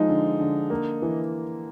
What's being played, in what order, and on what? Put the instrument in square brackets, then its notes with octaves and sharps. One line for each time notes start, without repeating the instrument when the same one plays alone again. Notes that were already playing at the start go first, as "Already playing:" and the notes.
Already playing: [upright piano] F3 G#3 [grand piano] D#4
[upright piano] D3
D3
A#3
E3